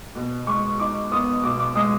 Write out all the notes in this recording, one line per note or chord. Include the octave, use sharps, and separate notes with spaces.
B2
G#3 C#6
D#4 D6
B3 D#6
B2 D6
D6
G#3 D#6